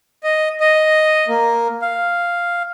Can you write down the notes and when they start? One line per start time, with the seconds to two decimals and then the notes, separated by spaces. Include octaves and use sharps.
0.23 D#5
0.60 D#5
1.28 A#3
1.82 F5